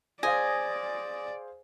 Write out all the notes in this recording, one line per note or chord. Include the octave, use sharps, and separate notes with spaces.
G#4 C5 D5 F5 G#5 D#6 A#6